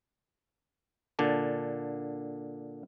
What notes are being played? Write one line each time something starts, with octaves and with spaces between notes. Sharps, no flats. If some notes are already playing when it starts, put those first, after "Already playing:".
A#2 D3 D5 A5